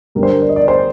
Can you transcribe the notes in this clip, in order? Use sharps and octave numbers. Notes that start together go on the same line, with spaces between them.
G2 D3 G3 D4 A#4
C5
A#4
D5
D#5
D5
C5